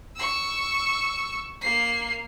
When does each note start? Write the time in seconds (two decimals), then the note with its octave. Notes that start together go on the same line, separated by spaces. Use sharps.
0.17 C#6 E6
1.61 A#3 C7